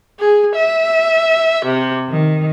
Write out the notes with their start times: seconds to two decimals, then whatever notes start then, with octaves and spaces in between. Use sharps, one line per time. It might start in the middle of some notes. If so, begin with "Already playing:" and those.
0.19 G#4
0.56 E5
1.67 C3
2.09 D#3